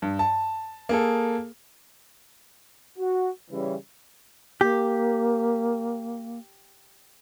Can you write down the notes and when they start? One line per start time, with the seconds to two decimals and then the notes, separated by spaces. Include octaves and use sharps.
0.02 G2
0.19 A5
0.89 A#3 G#4 A4
2.99 F#4
3.51 C#3 E3 G3 C#4
4.61 A#3 G4